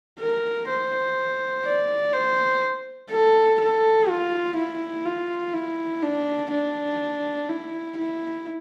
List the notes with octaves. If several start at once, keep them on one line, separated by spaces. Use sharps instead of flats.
A#4
C5
D5
C5
A4
A4
F4
E4
F4
E4
D4
D4
E4
E4